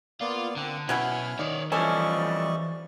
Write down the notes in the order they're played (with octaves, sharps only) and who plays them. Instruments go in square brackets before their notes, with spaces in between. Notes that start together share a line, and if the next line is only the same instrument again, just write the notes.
[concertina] A#3 B3 D5 [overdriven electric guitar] F4
[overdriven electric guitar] D3 [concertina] A#3 C4 F#5
[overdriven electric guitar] B2 B3 [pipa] F#3 C#4 E4 [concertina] G#5 F6
[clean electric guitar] D#3 [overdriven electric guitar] C#5 D5
[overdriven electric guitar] E3 [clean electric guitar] F3 G3 A4 [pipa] C#4 [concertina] D5 D#5 C#6